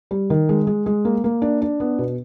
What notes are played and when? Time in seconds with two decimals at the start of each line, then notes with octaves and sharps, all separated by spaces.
0.11 G3
0.30 D#3
0.49 G#3
0.67 G#3
0.86 G#3
1.05 A#3
1.24 A#3
1.42 D4
1.62 D4
1.80 B3
1.99 B2